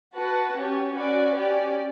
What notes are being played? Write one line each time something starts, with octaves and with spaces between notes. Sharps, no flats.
F#4 B4 F#5 A5
C#4 G4 C#5
C#4 F#4 B4 D5
C#4 G4 D5